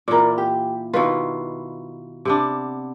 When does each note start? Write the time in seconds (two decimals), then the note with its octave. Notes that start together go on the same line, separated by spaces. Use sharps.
0.08 A#2 E3 A#4 D5
0.38 G4
0.93 B2 D#3 E4 F4 B4
2.25 C3 B3 D4